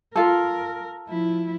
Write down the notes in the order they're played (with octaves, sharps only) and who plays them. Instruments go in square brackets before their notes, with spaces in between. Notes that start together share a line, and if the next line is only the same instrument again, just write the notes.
[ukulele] F4 A4 [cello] A#4
[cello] F3 E4